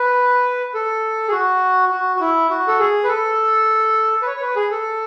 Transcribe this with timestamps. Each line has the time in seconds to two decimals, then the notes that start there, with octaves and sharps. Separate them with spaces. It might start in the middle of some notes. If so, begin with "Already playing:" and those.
Already playing: B4
0.74 A4
1.28 G#4
1.32 F#4
1.91 F#4
2.16 F#4
2.20 E4
2.50 F#4
2.68 A4
2.79 G#4
3.04 B4
3.08 A4
4.22 B4
4.26 C#5
4.37 C#5
4.41 B4
4.56 G#4
4.71 A4